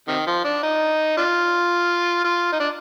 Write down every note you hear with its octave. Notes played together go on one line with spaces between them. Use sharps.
C3 D#3
F3
D4
D#4
D4 F4
F4
D#4
D4